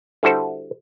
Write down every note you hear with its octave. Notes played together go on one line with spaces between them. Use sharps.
D3 G3 E4 F#4 A4 C5